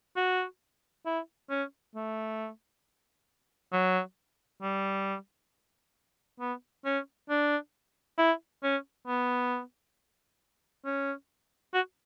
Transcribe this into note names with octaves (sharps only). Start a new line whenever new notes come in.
F#4
E4
C#4
A3
F#3
G3
B3
C#4
D4
E4
C#4
B3
C#4
F#4